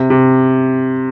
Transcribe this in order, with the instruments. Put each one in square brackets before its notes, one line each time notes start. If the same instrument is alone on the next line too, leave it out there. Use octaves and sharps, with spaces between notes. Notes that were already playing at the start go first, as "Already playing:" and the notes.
Already playing: [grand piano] C3
C3